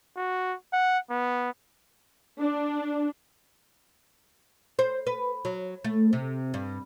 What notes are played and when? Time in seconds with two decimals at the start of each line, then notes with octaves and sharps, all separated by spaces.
0.17 F#4
0.73 F#5
1.10 B3
2.40 D4
4.79 C5
5.07 B4
5.45 F#3
5.84 A3
6.13 C3
6.54 G2